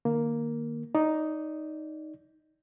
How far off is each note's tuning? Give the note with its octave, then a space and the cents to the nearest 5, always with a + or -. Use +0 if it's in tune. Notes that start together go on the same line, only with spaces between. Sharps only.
D#3 -35 A#3 +0
D#4 +0 D5 -20